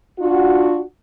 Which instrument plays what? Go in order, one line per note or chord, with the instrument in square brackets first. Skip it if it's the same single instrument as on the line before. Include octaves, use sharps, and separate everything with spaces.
[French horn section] D4 F4 F#4